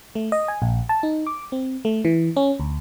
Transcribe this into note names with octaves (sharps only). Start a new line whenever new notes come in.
A3
D#5
G#5
A#1
A5
D#4
D6
C4
A3
E3
C#4
D2